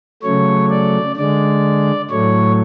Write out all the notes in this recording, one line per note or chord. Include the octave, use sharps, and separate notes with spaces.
C#3 F#3 A3 C#5
D5
D3 G#3 D5
A2 F#3 A3 C#5